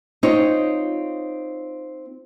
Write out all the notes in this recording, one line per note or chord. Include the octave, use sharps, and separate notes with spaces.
C4 D#4 F4 C#5